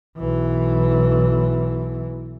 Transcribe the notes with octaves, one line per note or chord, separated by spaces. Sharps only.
B1 E3